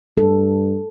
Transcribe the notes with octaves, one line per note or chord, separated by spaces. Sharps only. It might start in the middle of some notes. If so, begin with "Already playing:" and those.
G2 A4